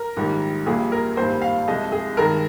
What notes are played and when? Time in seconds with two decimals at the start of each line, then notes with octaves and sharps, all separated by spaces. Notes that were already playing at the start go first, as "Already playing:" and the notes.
Already playing: A#4
0.17 A#1 G#2 D#3 G3
0.66 A#1 A#2 G3 A#3 G#4
0.92 A#4
1.16 G#1 G2 G3 A#3 C5
1.42 F5
1.68 C2 C3 F3 G#3 D#5
1.92 G#4
2.17 G2 D#3 G#3 A#4